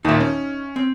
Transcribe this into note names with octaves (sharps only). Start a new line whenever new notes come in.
D#2 A#2 D#4 E5
C#4
C4